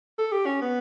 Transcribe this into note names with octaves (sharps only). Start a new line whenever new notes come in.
A4
G4
C#4
B3